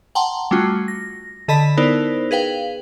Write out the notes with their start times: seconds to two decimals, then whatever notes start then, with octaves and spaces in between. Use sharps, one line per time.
0.15 F#5 G5 A5 A#5 C6
0.51 G3 A3 C#4 F4 F#4
0.88 A#6
1.48 D3 A4 D#5 A5 B5 B6
1.77 B3 D#4 E4 A#4 C5 D5
2.31 G#4 B4 F5 G5